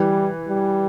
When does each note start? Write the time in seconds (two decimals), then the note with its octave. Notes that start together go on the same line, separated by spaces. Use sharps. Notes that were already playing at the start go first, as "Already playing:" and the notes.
Already playing: E3 G3
0.48 G3